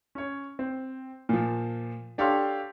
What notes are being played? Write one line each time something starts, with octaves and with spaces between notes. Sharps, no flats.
C#4 C#5
C4
A#2 F3
D4 G4 A4 C#5 F5 C6